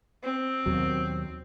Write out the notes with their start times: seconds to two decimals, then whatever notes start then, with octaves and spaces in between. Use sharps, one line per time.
0.23 C4
0.66 D#2 B2 F#3